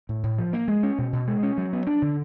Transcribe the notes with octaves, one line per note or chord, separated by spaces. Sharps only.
A2
A2
F3
A#3
G#3
C#4
B2
B2
G#3
C#4
F#3
B3
D4
D3